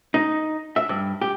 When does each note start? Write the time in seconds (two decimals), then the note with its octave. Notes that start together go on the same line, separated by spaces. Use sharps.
0.14 D#4
0.76 E5
0.89 G2
1.21 G4